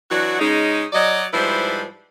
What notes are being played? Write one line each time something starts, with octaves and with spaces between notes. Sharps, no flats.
E3 F#3 D4 F#4
C#3 G#3 C#4 D#4
F#3 D5 D#5
G#2 F3 G3 E4 B4 C5